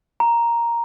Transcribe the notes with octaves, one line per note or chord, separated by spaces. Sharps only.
A#5